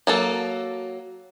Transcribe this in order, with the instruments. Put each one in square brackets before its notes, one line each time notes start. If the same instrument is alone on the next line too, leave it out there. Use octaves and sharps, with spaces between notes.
[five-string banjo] F#3 A#3 A4